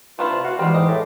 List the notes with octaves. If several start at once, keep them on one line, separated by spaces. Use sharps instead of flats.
A3 D4 E4 F4 B4
C3
F#4 F5
E3 G3 G#3 C4
G#2 G#3 D#5 D6
A2